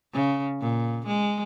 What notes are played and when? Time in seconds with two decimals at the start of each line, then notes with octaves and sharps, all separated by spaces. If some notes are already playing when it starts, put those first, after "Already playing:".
0.14 C#3
0.61 A#2
1.07 G#3